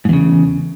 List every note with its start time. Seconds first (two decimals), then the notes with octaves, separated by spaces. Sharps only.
0.05 G#2
0.09 E2
0.13 C#3